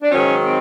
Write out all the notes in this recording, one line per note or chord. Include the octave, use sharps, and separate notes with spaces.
D4
G#2 D#3 F#3 C#4
C4